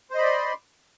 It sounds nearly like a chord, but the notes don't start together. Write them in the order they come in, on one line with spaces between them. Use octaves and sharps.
C5 D#5 B5 D5 C6